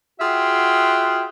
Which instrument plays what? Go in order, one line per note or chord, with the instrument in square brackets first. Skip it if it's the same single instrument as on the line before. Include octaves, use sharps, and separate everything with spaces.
[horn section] F4 F#4 G#4 E5 F#5 G5